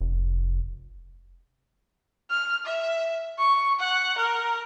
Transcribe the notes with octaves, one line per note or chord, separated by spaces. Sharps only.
F1
F6
E5
C#6
F#5
A#4